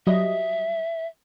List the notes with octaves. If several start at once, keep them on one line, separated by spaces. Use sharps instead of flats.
F#3 G3 D#5 E5